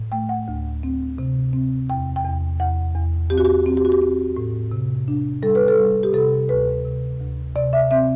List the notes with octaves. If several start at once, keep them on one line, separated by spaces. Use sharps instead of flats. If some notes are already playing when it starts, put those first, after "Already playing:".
Already playing: A2
A3 G5
F#5
D2
C4
C3
C4
E2 G5
G5
E2
E2 F#5
E2
C4 G4
F#4
G4
C4
G4
F#4
G4
C4
A2
C3
D4
G3 A4
B4
A4
G3
G4
C3 A4
D2 B4
C3
D2
C3 D5
E5
C4 E5